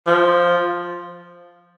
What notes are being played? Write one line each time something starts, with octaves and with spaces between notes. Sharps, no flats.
F3